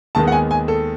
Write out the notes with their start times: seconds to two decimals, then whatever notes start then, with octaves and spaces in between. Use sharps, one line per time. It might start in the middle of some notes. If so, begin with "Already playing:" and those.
0.15 D#2 D#3 G#3 B3 A5
0.27 F#5
0.32 G#5
0.51 G#5
0.68 A4